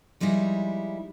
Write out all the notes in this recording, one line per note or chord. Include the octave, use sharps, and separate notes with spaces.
F3 G3 G#3 D#4 E4